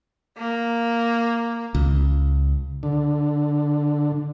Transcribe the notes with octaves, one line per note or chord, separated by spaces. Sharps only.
A#3
C#2
D3